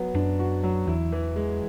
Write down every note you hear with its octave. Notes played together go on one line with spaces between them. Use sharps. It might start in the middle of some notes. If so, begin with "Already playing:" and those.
Already playing: F#3 B3
F#2 D4
F#4
F#3
E2 E4
E3
G#3